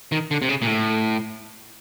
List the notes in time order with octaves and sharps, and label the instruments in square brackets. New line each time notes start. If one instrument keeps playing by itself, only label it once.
[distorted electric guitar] D#3
D3
C3
C#3
A#2
A2